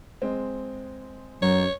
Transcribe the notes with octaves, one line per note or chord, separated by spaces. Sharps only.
G#3 C4
F#2 F#3 C#5